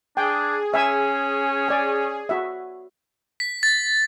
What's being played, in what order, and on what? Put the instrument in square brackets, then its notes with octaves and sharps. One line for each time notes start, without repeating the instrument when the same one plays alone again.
[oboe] D4 [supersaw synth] G#4 [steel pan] G5
[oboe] C#4 [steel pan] E5 G#5 E6
[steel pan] D5 G#5
F#4 E5
[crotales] B6
A6